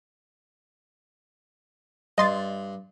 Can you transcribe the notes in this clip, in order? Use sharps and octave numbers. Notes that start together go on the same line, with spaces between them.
G2 D#5 C6 A6